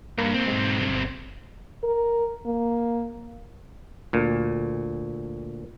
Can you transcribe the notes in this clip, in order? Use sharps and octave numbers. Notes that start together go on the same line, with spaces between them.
G2 A#3
B1 C4
G#2
G1
A#4
A#3
D2 A#2